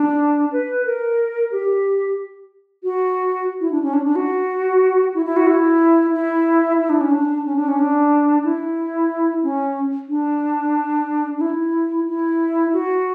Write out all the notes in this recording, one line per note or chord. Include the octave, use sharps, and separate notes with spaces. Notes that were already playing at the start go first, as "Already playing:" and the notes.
Already playing: D4
B4
A#4
G4
F#4
E4
D4
C#4
D4
D4
F#4
E4
E4
F#4
E4
E4
E4
D4
C#4
D4
C#4
D4
C#4
D4
E4
C#4
D4
D4
E4
E4
F#4